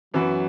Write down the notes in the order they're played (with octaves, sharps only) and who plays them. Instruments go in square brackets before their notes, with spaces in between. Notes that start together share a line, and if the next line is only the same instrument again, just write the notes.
[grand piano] F#2 E3 B3 F#4 [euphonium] F#3